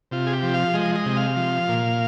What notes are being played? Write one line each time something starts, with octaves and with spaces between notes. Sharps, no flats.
C3 F4
G#4
G4
F3
F5
G#3 D#5
D#5
C3
F5
F3
A#2